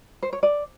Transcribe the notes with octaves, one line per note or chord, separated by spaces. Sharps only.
C5
C#5
D5